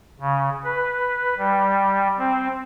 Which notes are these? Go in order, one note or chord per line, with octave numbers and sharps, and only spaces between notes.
C#3
B4
G3
C4